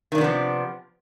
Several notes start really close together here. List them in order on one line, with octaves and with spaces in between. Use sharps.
D#3 D4 C3 B3 F3